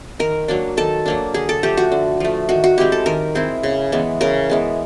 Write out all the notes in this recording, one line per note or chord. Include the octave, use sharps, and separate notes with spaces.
D#3 A#4
F#3 A#3 D4
D#3 A4
F#3 A#3 D4
D3 G#4
A4
F3 A3 G4
F#4
D3
F3 A3
D#3 F#4
F#4
G#3 C4 E4 G4
A4
D#3 A#4
G#3 C4 E4
C#3
E3 G#3 B3
C#3 A#4
E3 G#3 B3